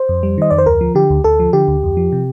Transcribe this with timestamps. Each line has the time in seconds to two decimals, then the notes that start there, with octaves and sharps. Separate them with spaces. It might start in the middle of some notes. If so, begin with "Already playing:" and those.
Already playing: C5
0.09 F2
0.23 G3
0.38 D#3 D#5
0.51 F2 D5
0.58 C5
0.66 D2 A#4
0.81 F3
0.95 D3 G4
1.10 D2
1.24 D2 A4
1.40 F3
1.53 D3 G4
1.68 D2
1.83 F2
1.97 F3
2.12 C3